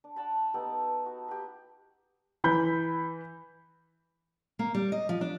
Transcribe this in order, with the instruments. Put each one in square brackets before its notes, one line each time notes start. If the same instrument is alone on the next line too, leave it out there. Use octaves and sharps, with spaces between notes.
[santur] D4
D5 F#5 A5 B5
B3 D#4 G4 A4
A5
F#4
G4 B4
[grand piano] E3 B5 G6
[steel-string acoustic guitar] A#3
G3
D#5
F3
D4